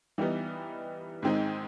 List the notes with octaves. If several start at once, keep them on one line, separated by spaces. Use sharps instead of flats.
E3 G3 B3 D#4
G#2 D#3 G#3 C4 D#4